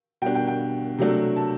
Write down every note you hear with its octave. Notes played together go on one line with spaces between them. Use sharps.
B2 G3 D4 G5
G5
G5
C3 F#3 A3 D4
A5